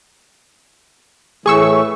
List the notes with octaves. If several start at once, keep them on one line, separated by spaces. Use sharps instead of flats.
A2 E3 A3 G#4 C#6 E6